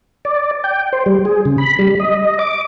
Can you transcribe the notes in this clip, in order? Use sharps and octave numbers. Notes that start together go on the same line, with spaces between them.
D5
G5
C5
G3
G#4
C#3
B5
G3
D#5
D6